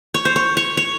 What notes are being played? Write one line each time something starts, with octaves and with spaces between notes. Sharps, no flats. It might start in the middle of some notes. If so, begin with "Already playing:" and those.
C#5
C5
C#5
C#5
C#5